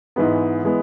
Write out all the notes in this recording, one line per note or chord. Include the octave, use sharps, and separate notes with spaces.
G#2 E3 G#3 B3
E3 G#3 B3